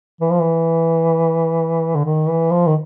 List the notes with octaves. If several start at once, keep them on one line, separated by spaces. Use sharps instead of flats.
E3
F3
E3
D3
D#3
E3
F3
D#3